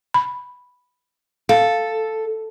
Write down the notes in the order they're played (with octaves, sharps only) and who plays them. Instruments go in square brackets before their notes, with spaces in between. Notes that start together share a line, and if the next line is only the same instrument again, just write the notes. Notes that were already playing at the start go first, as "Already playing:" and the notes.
[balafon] B5
[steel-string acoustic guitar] A4 [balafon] F5